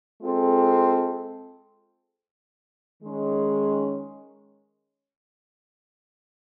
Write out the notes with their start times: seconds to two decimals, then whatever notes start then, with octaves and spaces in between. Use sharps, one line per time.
0.20 G#3 C4 F4 A4
3.03 D#3 G#3 C#4